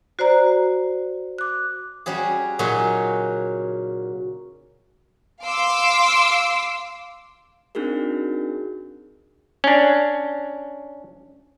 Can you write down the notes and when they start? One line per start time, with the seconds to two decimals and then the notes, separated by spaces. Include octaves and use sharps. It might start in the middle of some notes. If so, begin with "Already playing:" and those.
0.19 F#4 C5 D5 A#5
1.38 D6 F#6
2.06 G3 C#4 F#4 G#4
2.59 A#2 C#3 F#3 C#4 D#4 F#4
5.42 F5 C6 D6 E6
7.75 C4 D4 D#4 F#4 G#4 A#4
9.64 C#4 D4